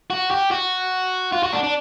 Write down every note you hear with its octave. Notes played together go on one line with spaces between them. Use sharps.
F#4
G4
F#4
F4
F#4
D4
D4